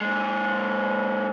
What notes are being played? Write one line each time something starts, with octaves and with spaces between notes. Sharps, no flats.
A#2 G#3